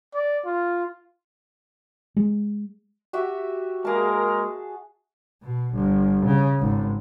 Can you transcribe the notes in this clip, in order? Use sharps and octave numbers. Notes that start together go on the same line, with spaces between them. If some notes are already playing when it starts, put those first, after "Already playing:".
D5
F4
G#3
F#4 G4 E5
G#3 A#3 G#4 A#4 A5
B2
G1
C#3
G#1